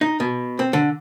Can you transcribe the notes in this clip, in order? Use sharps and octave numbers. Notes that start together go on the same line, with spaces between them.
D#4
B2
C4
D3